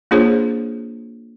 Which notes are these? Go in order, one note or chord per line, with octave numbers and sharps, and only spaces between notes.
A#3 D4 F4 G#4 C5 C#5